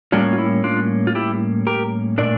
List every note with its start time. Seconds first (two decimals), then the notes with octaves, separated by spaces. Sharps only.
0.12 A2 G3 A#3 C#4 D4 F4
0.33 F4
0.39 E4
0.64 D4 F4
1.07 F4
1.15 E4 G4
1.67 G4 A#4
2.18 A#2 A3 D4 A#4 D5